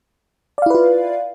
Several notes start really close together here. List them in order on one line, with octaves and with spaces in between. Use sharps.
D5 F5 E4 B4 F4